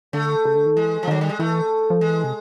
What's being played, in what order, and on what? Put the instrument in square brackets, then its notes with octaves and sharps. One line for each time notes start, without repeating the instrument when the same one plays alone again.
[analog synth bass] D3 [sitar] A3
[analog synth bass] C#3
D3
D#3
[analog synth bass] E3 [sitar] G#3
[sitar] F3
[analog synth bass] D#3 [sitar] F#3
[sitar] G3
G#3
[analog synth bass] E3 [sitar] A3
[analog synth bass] F3
[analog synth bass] E3 [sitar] G#3
[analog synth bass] C3